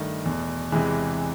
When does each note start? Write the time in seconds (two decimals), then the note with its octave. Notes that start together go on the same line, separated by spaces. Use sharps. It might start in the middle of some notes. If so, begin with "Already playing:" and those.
Already playing: G2 D#3 A3
0.26 E2 B2
0.72 E2 C3 E3 G#3